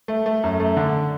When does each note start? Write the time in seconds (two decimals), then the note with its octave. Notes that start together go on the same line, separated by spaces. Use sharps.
0.08 A3
0.26 A3
0.43 F#2
0.60 A3
0.77 D3